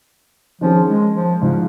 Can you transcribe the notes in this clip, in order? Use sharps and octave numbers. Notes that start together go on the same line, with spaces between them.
D#3 F3 C#4 G#4
G#3
F3
G#2 C#3 F3 G#3 F4